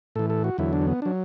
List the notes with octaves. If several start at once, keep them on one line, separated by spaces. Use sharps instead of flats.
A2 E3 A4
A4
F#4
E2 D3 F#3 E4
D4
B3
F#3 D4